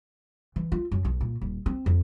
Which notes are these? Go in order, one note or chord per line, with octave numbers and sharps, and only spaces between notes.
E3
F4
F#2
B1
A#2
D#1
C4
F2